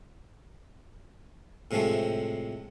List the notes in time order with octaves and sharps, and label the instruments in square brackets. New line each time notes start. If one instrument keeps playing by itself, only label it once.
[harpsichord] A2 C3 F3 G#3 A3